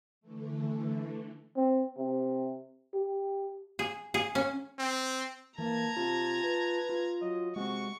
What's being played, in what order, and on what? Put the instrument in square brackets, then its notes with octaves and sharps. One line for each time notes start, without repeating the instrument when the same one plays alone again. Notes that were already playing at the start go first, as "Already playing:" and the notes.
[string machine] D3 E3 A3
[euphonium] C4
C3
G4
[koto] G#4
G#4
C#4
[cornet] C4
[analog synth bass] E3 [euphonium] A#3 [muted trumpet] A5 [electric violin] A#5 G#6
[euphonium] C3 [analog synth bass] F4
[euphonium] B4
[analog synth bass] F4
[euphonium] F#3 [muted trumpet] D#5
[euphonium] C3 [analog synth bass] G#3 [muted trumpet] F#4 [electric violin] C#6